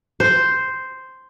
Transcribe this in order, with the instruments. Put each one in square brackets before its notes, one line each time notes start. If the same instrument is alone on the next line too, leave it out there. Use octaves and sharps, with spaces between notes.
[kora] C5